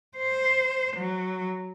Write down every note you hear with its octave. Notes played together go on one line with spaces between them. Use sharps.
C5
F#3